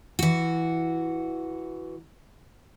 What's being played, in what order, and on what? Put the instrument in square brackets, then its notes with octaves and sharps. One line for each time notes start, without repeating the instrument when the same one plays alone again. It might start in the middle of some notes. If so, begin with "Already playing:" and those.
[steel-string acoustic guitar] E3 F#4